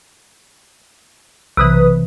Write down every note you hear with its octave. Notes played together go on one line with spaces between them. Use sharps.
B1 C3 E3 B4 D#6